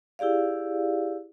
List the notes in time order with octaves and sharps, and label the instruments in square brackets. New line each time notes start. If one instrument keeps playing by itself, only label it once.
[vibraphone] E4 G4 G#4 D5 F5